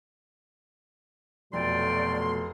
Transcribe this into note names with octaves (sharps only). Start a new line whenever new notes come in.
F1 B2 F#3 A3 D5 G5 C6